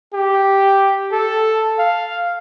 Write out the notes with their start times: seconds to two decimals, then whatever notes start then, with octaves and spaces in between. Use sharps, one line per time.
0.14 G4
1.12 A4
1.79 F5